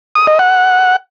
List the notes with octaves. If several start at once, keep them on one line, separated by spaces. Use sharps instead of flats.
D#6
D#5
F#5